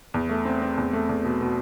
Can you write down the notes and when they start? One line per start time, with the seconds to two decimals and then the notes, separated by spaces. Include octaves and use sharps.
0.14 E2
0.29 A3
0.45 C4
0.62 C4
0.78 E2
0.93 A3
1.09 E2
1.24 B2
1.41 B2